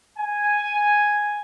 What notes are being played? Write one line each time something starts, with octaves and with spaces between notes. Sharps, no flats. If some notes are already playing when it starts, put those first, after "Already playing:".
G#5